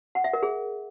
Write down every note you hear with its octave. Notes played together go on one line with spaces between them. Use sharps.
F#5
E5
A#4
G#4